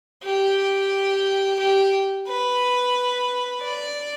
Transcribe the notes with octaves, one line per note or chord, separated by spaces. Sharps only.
G4
G4
B4
D5